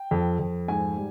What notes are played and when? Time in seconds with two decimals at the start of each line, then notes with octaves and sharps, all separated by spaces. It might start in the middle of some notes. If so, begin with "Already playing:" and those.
Already playing: G5
0.11 F2
0.39 F2
0.68 G#2 G#5
0.96 G3